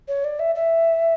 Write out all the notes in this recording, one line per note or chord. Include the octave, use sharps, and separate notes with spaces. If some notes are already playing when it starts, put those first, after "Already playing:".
C#5
D5
E5
E5